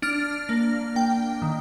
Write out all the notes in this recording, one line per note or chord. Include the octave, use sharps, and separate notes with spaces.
D4 F6
A#3
A#3 G5
D#3